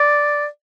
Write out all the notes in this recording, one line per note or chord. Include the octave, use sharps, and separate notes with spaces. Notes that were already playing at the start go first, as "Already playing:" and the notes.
Already playing: D5